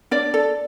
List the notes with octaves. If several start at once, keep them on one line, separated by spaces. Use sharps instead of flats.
D4 D5
A4